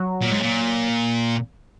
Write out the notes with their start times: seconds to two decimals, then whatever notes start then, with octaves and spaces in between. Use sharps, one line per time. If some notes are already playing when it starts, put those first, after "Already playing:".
Already playing: F#3
0.22 A#2
0.31 G#2
0.40 A#2